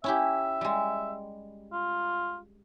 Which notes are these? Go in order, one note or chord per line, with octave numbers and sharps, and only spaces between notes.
C#4 E4 G4 E5
G3 G#3
F4